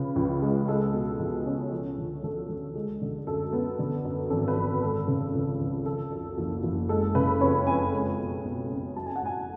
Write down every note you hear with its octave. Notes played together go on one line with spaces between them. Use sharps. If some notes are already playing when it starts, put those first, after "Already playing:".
Already playing: C#3 F3 B4
C#2
G#3
G#3 A4
B2
C#2
C#4
F3
D3
D2 A4
D2
G#3
D3
F#2 A4
B3
D3
F#2
G#1 A4
B4
G#1
G#3 A4
C#3
C#2
C#2
F3 A4
F#2
F#1
F#1
G#3 A4
C#3 B4
F2 C#5
F2 G#5
G#3
B2
B1
C#4
F#3 A5
G#5
F#5
A2 G#5